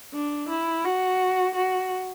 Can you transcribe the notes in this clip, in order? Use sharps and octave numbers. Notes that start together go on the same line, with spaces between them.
D4
E4
F#4
F#4